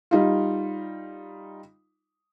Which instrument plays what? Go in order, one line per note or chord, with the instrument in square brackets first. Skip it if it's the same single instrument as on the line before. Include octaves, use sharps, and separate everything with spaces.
[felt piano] G3 D#4 F4